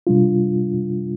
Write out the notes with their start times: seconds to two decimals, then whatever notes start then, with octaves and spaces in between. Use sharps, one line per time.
0.07 C3 G3 D4 F4